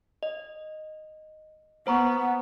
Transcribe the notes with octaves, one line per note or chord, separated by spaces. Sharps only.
D#5
B3 C5 A#5 C#6